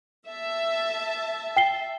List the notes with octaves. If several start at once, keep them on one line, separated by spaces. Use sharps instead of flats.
E5 A5
G5 C7 G7